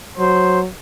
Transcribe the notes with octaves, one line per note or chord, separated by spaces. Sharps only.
F#3 C5